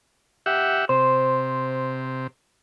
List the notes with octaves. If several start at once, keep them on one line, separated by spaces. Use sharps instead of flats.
G4 E5 F#5
C3 C5